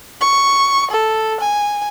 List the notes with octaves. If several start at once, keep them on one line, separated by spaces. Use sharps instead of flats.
C#6
A4
G#5